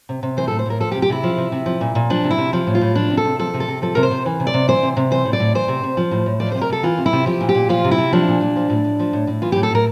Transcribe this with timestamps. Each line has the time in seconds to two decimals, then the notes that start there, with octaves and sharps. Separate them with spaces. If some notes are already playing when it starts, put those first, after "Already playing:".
0.09 C3
0.23 C3
0.37 E3 C5
0.48 A2 A4
0.59 C5
0.66 A2 A#4
0.80 F3 A4
0.92 G4
0.95 C3
1.02 G4
1.10 C3 E4
1.23 F3
1.38 C3
1.52 C3
1.66 F3
1.81 A#2
1.95 A#2
2.10 F3 D4
2.24 C3
2.30 E4
2.38 C3
2.53 F3
2.67 A2
2.75 F4
2.81 A2
2.95 F3 D4
3.10 C3
3.17 A4
3.24 C3
3.39 F3 A4
3.54 C3
3.60 A4
3.68 C3
3.82 F3 A4
3.95 C3 A#4
4.03 C5
4.11 C3
4.26 E3
4.40 C3
4.47 D5
4.54 C3
4.68 E3 C5
4.83 C3
4.97 C3
5.11 E3 C5
5.25 A2
5.33 D5
5.40 A2
5.55 E3 C5
5.68 C3
5.83 C3
5.97 F3
6.11 A2
6.26 A2
6.40 F3 D5
6.52 C3 C5
6.61 A#4
6.69 C3 A4
6.83 E3 F4
6.98 C3
7.06 E4
7.13 C3
7.26 F3 G4
7.41 A#2
7.49 G4
7.55 A#2
7.69 F3 F4
7.85 C3
7.91 E4
7.98 C3
8.12 F3 D4
8.28 A#2
8.41 A#2
8.56 F3
8.70 A2
8.84 A2
8.99 F3
9.13 A2
9.27 A2
9.42 E3 F4
9.52 A2 G4
9.63 A4
9.71 A2 A#4